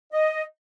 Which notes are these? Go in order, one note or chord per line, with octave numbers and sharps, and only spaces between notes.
D#5